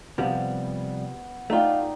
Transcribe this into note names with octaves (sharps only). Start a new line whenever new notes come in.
C3 F3 G3 B3
A3 D#4 F4 D5 G5